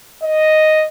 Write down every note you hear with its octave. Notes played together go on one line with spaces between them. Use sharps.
D#5